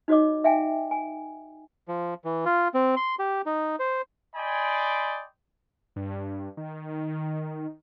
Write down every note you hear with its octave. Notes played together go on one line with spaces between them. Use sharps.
D#4 F#4 C#5 D#5 D6
E5 F5 G5 G#5
G#5
F3
E3
F4
C4
C6
G4
D#4
C5
D5 D#5 G5 G#5 B5 C6
G2
D#3